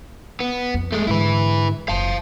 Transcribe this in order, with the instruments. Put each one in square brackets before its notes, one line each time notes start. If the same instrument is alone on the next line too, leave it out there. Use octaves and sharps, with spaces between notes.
[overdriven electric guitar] B3
[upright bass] F2
[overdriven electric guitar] G#3 A3
[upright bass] G#2 D3 [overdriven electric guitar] E4 B4
[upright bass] F#1 [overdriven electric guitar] F5 A5